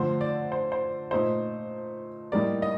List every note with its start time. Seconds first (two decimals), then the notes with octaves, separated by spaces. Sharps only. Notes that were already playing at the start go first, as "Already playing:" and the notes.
Already playing: D3 F3 A3 C5
0.21 D5
0.52 C5
0.72 C5
1.11 A#2 A3 D#4 C5
2.32 A2 G3 A#3 D#4 D5
2.62 D#5